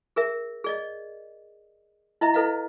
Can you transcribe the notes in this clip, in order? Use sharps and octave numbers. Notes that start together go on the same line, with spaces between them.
G#4 A#4 E5
G#4 D5 D#5
E4 D#5 E5 A#5
E4 A4 B4 D#5 F5